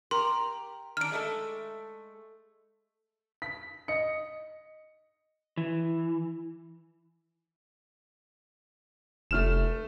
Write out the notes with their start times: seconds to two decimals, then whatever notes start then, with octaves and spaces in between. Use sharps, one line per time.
0.11 G4 A#4 C6
0.97 D#3 D4 F6 D7
1.12 G#3 A3 A4
3.42 B6
3.88 D#5 C#7
5.57 E3
9.31 F1 A3 F6 E7